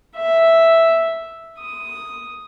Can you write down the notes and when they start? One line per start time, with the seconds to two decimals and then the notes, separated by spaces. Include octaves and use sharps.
0.16 E5
1.59 D#6